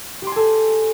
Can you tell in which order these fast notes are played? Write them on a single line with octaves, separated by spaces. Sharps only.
G4 C6 G#5 A4